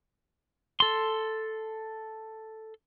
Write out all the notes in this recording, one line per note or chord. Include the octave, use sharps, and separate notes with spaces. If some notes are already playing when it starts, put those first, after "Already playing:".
A4 C6